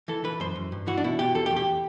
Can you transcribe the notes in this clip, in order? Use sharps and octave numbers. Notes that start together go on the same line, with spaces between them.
E3 A4
E3 B4
F#2 C5
F#2
G2
E3 F#4
D4
B2 E4
B2 G4
E2 A4
G4
E2
G4